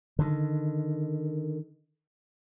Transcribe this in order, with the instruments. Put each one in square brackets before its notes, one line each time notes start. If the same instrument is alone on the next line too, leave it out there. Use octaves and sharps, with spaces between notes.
[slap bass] D3 D#3